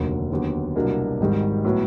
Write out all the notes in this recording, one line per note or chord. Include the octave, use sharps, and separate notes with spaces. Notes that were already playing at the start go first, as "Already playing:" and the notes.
Already playing: F1 D#2 D3 F#3 A#3
D#2 D3 F#3 B3
C2 B2 F#3 A#3 D4
G#1 G#2 D#3 G3
A2 F#3 B3